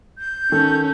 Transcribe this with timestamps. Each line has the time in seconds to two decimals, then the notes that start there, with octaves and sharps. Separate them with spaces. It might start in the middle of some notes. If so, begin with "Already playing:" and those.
0.19 G6
0.52 D#3 C#4 A4